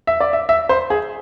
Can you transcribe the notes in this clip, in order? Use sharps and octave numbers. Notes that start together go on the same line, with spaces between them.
E5
D5
E5
E5
C5
G#4